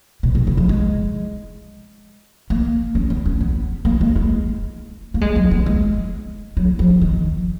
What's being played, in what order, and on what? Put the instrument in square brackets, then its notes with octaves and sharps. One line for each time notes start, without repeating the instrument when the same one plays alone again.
[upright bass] B2
B2
C#3
F3
G#3
A#3
C#4
B3
C#4
B3
A#3
G#3
G#3
A#3
G#3
F#3
B3
G#3
F#3
F3
D#3